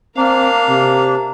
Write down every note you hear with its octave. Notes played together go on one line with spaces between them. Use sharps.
A#3 C4 D4 A#4 F5
C3